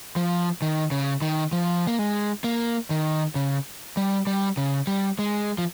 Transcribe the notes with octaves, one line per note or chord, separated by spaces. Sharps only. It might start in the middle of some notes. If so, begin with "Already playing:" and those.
F3
D#3
C#3
D#3
F3
A#3
G#3
A#3
D#3
C#3
G3
G3
C#3
G3
G#3
F3